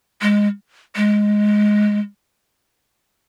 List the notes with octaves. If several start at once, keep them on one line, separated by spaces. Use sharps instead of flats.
G#3
G#3